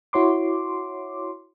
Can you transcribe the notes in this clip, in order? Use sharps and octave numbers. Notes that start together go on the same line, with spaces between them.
E4 F#4 C#5 C6 D6